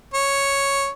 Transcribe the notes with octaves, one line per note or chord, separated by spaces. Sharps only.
C#5